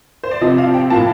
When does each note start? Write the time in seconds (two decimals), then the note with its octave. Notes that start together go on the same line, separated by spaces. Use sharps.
0.24 C5
0.31 D5
0.41 C3 F3 C4 D#5
0.58 F5
0.74 G5
0.90 A2 F3 A#3 A5